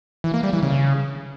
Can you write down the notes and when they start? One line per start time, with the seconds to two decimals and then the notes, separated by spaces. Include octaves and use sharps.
0.24 E3
0.34 A#3
0.43 G3
0.53 E3
0.63 C#3